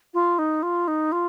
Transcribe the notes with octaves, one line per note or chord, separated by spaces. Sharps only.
F4
D#4
F4
D#4
F4